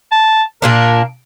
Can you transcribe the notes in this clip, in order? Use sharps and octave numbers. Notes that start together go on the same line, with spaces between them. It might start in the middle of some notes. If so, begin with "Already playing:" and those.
A5
A#2 A#3 D4 A#4